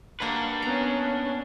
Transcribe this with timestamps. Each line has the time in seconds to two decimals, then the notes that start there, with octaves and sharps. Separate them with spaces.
0.20 A#3 D4 F#4 B4
0.62 B3 C#4 A#5